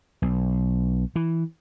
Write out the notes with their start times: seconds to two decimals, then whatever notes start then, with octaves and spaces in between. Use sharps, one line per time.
0.22 B1
1.16 E3